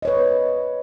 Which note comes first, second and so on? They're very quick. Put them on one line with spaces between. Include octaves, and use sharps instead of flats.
D#5 C#5 B4